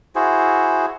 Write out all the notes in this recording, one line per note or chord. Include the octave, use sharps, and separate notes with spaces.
E4 F#4 G#4 C5